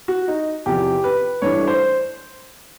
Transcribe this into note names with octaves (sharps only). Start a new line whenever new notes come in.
F#4
D#4
E2 C3 F3 G4
B4
G2 E3 A3 D4 C#5
C5